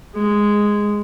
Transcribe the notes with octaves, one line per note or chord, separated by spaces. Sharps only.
G#3